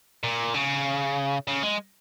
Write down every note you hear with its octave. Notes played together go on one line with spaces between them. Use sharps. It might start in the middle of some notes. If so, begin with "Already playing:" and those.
A#2
C#3
C#3
G#3